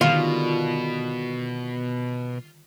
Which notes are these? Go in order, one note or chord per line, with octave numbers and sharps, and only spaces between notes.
B2 D3 D#3 G3 F4